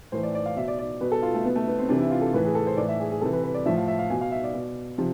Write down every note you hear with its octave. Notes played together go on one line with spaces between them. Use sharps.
A2 E3 C5
D5
D5
F5
B2 E5
D5
D5
B2 B4
A4
F4
A3
B2 B3
A3
B3
C4
C3 E3 D4
E4
F4
A4
A2 E3 B4
G#4
A4
C5
A2 E3 D5
E5
G#4
G#4
C3 E3 A4
B4
B4
D5
A2 F3 E5
F5
E5
F5
B2 G#5
F5
E5
D5
B2
C3 F3